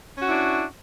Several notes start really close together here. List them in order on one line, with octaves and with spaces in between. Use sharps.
C#4 F#4 E4 D4